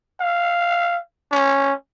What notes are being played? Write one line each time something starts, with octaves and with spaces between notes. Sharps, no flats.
F5
C#4